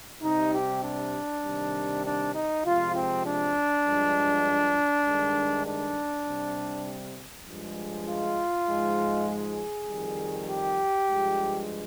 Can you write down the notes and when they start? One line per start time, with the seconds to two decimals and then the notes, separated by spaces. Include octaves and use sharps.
0.22 C3 G3 D#4
0.52 G4
0.82 D4
1.43 C3 D#3 G3
2.03 D4
2.33 D#4
2.63 C3 F3 G#3 F4
2.93 C4
3.25 D4
3.85 G2 F3 G#3
5.05 G2 D#3 G#3
5.66 D4
6.26 C3 G3
7.46 G2 F3 G#3
8.07 F4
8.67 G#2 F3 G#3
9.28 G#4
9.88 F2 D#3 G3
10.48 G4
11.08 G2 F3 G#3